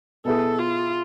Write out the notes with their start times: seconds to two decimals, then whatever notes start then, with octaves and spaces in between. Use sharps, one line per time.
0.25 B2 B3 E4 G#4 A4
0.59 F4